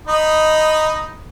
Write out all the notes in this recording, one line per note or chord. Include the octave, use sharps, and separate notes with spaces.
D#4 D#5 B5